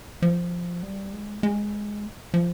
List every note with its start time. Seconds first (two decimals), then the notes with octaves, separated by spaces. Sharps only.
0.22 F3
0.83 G3
1.13 G#3
1.43 G#3
2.34 F3